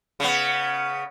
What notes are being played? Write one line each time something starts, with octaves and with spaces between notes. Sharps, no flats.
C#3 B3